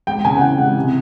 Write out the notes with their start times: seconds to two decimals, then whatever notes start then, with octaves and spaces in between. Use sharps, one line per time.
0.07 G#3 G5
0.25 C#3 G#5
0.37 F#5
0.42 E3 G5
0.58 G#3 F#5
0.76 C3